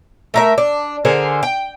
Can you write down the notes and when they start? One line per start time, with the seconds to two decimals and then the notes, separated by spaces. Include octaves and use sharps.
0.34 A3 A#4 E5
0.58 D4
1.05 D3 G#4 A#4 C5
1.43 G5